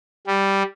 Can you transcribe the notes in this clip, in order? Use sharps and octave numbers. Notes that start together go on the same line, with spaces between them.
G3